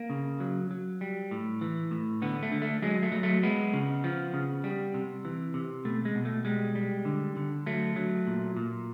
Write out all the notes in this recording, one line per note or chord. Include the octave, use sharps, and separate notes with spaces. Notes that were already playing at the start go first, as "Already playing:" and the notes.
Already playing: A#3
C#3
F#3
F#3
G3
A2
E3
A2
D3 B3
A3
D3
A3
F#3 G#3
A3
F#3
A3
G#3 B3
C#3
F3
C#3
G3
C3
E3
C3
B2 A3
G#3
B2
A3
G3 G#3
G3
D3
D3
F#3 A3
F#3
A#2
A#2